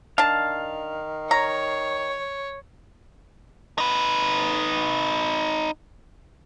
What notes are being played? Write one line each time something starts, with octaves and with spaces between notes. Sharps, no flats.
D#3 D4 F5 A5
C#5 A#5
D#4 B4